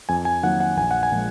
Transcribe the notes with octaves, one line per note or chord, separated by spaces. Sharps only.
F2 G#5
G#5
D#3 F#3 A#3 F#5
F#5
A#1 G#5
F#5
G#5
A#2 F3 G#3